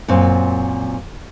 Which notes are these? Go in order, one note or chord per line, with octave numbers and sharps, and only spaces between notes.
F#2 A#2 C4